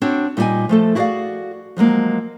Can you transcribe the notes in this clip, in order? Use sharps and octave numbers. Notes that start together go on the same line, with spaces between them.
C4 D4 F#4 C5 C#5
A#2 G3 D#4 F#4 D#5 G#5
F3 A3 A4
E4 F#4 G#4 C5 D5 F5
F3 F#3 G#3 A#3